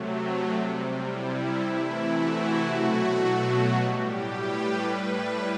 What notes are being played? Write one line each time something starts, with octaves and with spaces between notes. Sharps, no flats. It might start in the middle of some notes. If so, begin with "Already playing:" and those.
Already playing: C3 F#3 A3
C3 G3
E4
C3 E3 A3 E4
F#4
B2 F#3 A3
A2 G3 G4
B4
A2 G3